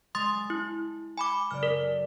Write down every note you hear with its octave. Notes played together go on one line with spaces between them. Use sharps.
G#3 C6 D#6 A6
E4
G#5 B5 D6
F#1 D5 F6
A4 A#4